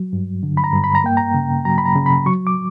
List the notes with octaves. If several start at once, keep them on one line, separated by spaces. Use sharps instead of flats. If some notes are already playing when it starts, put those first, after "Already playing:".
Already playing: F#3
G2
D3
B5
A#5
G2
B5
A#5
A#3 G5
A#5
C#3
F#3 A#5
B5
A#5
C#3
B5
F#3 C#6
D6